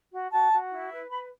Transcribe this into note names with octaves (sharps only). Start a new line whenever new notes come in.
F#4
F#4 A5
F#4
E4
B4
B4 B5